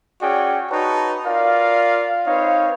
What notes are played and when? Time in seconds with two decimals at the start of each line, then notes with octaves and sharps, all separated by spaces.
0.22 C#4 F#4 G#4 D5 G5
0.70 D#4 F#4 B4 C#5 A5
1.25 F4 A#4 D5 F5
2.27 C4 D#4 B4 C#5 F5